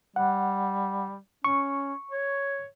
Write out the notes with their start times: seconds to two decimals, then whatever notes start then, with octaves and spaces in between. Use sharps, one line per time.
0.16 G3 F#5
1.45 C#4 C#6
2.11 C#5